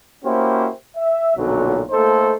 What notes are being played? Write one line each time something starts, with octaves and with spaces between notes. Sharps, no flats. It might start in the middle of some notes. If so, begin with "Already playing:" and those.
A#3 C#4 E4 F#4 G4 C5
E5
B1 F2 A#2 D3 F#3
A3 A#3 D#4 A4 C5